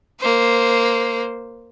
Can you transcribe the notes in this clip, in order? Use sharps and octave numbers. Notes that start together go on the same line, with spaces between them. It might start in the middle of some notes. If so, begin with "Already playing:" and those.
A#3 C5